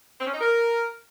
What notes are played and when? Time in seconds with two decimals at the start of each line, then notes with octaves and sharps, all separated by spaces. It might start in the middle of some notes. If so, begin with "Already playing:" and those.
0.21 C4
0.27 C#4
0.34 D#4
0.41 A#4